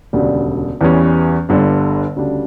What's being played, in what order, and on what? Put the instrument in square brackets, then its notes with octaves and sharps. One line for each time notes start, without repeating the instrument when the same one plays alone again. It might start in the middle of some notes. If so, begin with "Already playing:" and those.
[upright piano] E1 D2 C#3 G3 D4
E2 E3 G3 C#4
G1 G2 D3 G3 D4
D2 C#3 G3 D4